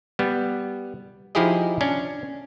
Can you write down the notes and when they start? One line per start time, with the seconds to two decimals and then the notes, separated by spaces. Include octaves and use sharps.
0.19 G3 B3
1.35 F3 D#4 E4 G4 G#4 D#5
1.81 C#4 D4